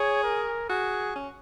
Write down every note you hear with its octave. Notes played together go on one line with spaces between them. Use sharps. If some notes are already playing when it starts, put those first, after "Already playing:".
Already playing: G#4 C#5
A#4
F#4 G#4
C#4